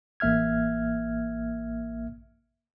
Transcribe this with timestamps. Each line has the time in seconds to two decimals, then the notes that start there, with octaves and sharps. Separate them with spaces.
0.20 A1 A#3 E5 F6 G#6